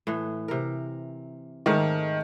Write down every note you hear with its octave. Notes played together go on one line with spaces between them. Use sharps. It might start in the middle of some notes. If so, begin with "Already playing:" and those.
A2 E3
C3 A#4
G#2 D#3 A3 F5